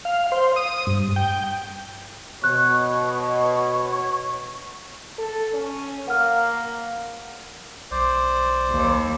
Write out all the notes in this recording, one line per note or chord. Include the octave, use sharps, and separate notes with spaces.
F5
C5
D#6
G2
G5
B2 C#5 F#6
A4
C#4
A#3 F#5 F6
B1 C5 D5
D#2